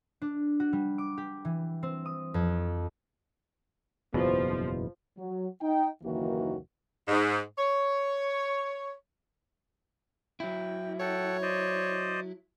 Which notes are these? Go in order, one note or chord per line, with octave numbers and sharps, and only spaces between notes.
D4
F#4
G3
D6
G4
E3
C4
D#6
F2
F#1 E2 B2 F3
F#3
D#4 G5
F#1 D#2 D#3 E3 A#3 F#4
G#2
C#5
F#3 E4 G5
A4 C#5 F#5 G5
C5 D5 D#5